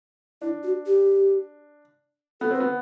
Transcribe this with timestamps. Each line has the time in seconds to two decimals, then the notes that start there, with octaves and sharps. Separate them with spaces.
0.42 D4 E4
0.63 F#4
0.86 G4
2.41 B3 A4
2.51 C4 B4
2.60 B3